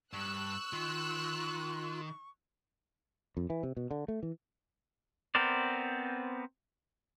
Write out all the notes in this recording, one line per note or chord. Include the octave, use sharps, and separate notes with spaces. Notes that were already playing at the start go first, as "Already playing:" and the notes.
G2 C#6 E6 F#6
D#3 F4 C6
F2
E3
C3
B2
D3
A3
E3
B3 C4 A#4 C5 D5